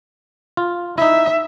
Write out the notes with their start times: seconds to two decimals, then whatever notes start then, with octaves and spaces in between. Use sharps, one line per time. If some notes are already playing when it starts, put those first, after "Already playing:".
0.57 F4
0.98 D#4 E4 E5